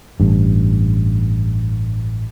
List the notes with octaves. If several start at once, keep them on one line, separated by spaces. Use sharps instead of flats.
A1 G2